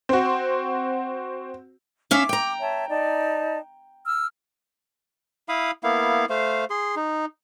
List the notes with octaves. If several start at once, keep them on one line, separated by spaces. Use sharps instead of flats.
C4 F#4
C#4 E5 F5 D6
G5 A#5
C#5 E5 A5
D#4 D5 A5
E6 F6
E4 F5 B5 D#6
A#3 B3 E4 F5
A3 C5 F5
G#4 C6
D#4